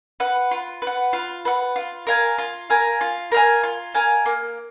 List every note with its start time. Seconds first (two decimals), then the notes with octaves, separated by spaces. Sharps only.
0.20 B4 F#5
0.51 F4
0.82 B4
0.87 F#5
1.13 F4
1.45 B4 F#5
1.76 F4
2.07 A#4 F5 G#5
2.38 F4
2.70 A#4 F5 G#5
3.01 F4
3.32 A#4 F5 G#5
3.63 F4
3.94 A#4 F5 G#5
4.26 A#3